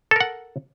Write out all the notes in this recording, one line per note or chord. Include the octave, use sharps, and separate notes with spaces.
A4 A#4 F#5